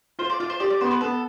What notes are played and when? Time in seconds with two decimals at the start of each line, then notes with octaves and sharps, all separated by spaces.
0.19 F4 C5
0.30 D5
0.40 F4 D5
0.50 C5
0.60 G4 D5
0.70 D5
0.81 B3 C5
0.91 B4
1.01 B3 A4